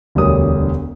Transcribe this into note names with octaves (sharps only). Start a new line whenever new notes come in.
E1 D2 G3 A#4 C#5 D#6